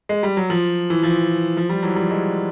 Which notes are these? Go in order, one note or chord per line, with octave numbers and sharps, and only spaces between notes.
G#3
G3
F#3
F3
E3
F3
F3
F3 G3
E3 F#3
F3 G3
F#3 G#3